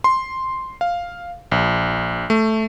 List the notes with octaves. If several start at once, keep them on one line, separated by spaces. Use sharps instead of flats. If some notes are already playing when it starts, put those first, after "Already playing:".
C6
F5
A#1
A3